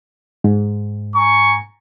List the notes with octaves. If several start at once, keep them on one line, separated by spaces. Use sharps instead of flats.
G#2
G#5 A#5 C#6